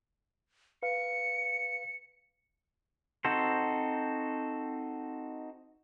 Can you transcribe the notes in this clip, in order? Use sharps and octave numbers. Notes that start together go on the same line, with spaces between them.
B4 F5 C#7
C4 D#4 F#4 A4 C5